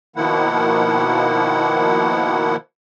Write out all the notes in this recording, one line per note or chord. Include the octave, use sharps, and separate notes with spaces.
B2 D#3 F3 A#3 E4 F#5